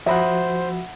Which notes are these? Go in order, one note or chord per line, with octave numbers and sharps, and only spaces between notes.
F3 F#4 C5 E5 F#5 A#5 B5 D#6